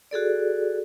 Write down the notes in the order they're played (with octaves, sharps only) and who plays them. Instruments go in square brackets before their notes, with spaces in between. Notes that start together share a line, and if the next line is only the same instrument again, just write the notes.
[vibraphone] F#4 G#4 A4 D5